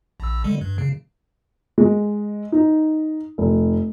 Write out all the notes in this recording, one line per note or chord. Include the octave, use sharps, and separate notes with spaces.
A#1 E6
D3 G3 G#3
G2
C#3
G#3
D#4
F1